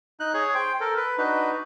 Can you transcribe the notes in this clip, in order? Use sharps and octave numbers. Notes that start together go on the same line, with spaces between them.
D#4 F#6
G#4 C#5
C5 G5
A4 A#4
B4
D4 D#4 F#4 B4